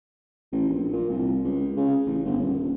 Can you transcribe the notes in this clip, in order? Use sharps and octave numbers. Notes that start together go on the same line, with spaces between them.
A1
A#1
A#2
C2
C#2
C#3
A1
G1
D#1